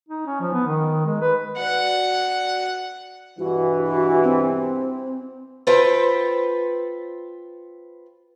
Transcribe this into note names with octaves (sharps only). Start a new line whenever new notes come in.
D#4
C#4
F3
B3
D#3
G#3
B4
F#4 D5 F#5
G2 B2 E3 F#4
F#4
C4
F4 A4 B4 C5 G5